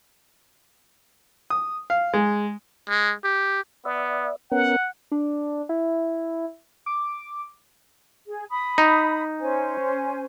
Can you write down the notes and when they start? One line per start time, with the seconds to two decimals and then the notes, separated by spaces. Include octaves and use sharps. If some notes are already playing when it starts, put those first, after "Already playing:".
1.50 D#6
1.90 F5
2.14 G#3
2.89 G#3
3.24 G4
3.85 B3 D5 E5
4.52 B3 C#4 A#4 F#5
5.12 D4
5.69 E4
6.86 D6
8.28 G#4
8.51 B5 D#6
8.78 D#4
9.40 C#4 C5 G#5